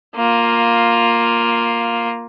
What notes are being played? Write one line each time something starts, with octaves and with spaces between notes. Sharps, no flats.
A#3 F4